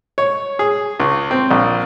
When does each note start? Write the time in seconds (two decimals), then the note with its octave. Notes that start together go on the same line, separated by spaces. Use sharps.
0.18 C#5
0.59 G#4
1.00 C#2
1.31 C4
1.51 A#1